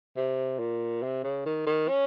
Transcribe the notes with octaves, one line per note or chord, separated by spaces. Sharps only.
C3
A#2
C3
C#3
D#3
D#3
C#4